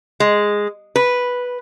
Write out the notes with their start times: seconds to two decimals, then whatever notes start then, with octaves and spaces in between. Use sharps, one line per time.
0.20 G#3
0.96 B4